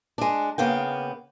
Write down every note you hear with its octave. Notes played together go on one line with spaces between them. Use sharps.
G#3 D4
C#3 A#3 B3 G5